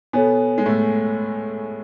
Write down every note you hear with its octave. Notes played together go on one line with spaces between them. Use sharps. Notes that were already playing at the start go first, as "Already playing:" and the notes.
B2 B3 A4 C#5 G#5
G#3
A2 A3